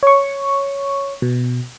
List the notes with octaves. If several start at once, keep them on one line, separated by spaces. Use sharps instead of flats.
C#5 C#6
B2